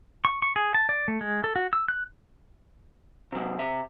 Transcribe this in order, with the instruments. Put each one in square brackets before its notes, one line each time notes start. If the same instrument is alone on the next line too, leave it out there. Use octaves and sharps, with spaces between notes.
[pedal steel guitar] C#6
C#6
G#4
A5
D5
A3
G#3
A4
F#4
E6
F#6
[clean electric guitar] C3 F#3
C3 E5